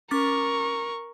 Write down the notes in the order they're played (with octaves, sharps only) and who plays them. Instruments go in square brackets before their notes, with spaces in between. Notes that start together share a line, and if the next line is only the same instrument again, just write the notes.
[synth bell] C#4 D6 A6 [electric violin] A#4 C#6